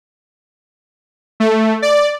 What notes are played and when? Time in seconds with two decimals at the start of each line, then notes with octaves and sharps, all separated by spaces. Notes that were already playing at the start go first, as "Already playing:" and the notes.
1.40 A3
1.82 D5